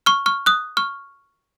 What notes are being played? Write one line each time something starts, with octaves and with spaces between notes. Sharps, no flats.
C#6 F6
C#6 F6
D#6 F#6
C#6 F6